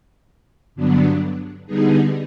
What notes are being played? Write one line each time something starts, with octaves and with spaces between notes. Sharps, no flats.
G2 D3 F#3 B3 D4
D3 G3 B3 D#4 G#4